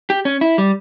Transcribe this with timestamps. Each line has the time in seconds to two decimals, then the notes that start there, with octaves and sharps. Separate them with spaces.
0.10 G4
0.25 C#4
0.41 E4
0.58 G3